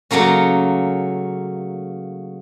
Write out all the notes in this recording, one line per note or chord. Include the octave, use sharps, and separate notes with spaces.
C#3 F#3 A3 A#3 C#4